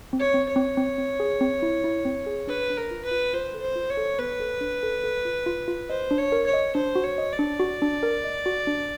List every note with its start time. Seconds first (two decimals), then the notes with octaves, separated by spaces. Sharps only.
0.13 C4
0.19 C#5
0.34 C4
0.49 C#5
0.56 C4
0.77 C4
0.98 C4
1.20 G#4
1.41 C4
1.62 E4
1.84 E4
2.05 C4
2.26 G#4
2.47 D4 B4
2.70 D4
2.77 A#4
2.91 F4
3.04 B4
3.11 F4
3.33 F4 C5
3.54 A4
3.61 C5
3.76 F4
3.90 C#5
3.97 A4
4.19 B3 B4
4.40 A4
4.61 D4
4.83 A4
5.03 A4
5.25 F4
5.46 F4
5.68 F4
5.89 C5 D#5
6.11 D4
6.18 C#5
6.32 A#4
6.46 C#5
6.53 D#5
6.75 D4 C5
6.95 F#4
7.04 C#5
7.18 D#5
7.32 D5
7.39 D4
7.60 F#4
7.82 D4
8.03 A#4
8.24 D#5
8.46 F#4
8.67 D4